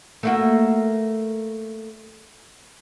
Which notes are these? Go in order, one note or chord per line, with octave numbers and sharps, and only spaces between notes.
A3 A#3 F#4